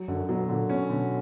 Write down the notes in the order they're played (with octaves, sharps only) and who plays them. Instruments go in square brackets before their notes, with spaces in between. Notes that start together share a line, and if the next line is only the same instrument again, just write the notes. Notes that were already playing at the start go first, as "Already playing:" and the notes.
Already playing: [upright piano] F#3
[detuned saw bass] F#2 [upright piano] D3
[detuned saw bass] B2 [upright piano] F#3
[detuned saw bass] A#2 [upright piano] D3
[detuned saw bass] B2 [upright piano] C#4
[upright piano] D3